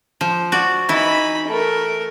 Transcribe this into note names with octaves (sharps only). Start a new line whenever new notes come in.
F3
F#4 D5
E3 D#4 E4 B5
A3 A#4